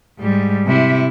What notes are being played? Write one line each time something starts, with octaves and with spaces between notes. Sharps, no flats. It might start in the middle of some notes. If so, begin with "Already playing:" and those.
G#2 G3
C3 E4